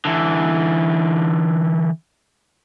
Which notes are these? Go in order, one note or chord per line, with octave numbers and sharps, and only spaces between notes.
D3 E3